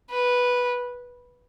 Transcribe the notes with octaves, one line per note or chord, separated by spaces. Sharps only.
B4